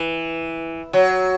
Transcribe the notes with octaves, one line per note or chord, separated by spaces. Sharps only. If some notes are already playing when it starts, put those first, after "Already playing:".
Already playing: E3
F#3